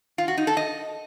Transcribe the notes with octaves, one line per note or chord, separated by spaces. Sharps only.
F4
F#4
D#4
A4
D#5